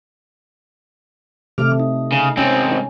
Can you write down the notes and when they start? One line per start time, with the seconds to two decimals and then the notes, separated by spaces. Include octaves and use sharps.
1.58 C3 D#3 A3 D6 F6
1.80 D#4
2.12 C#3
2.37 G#2 C4 C#4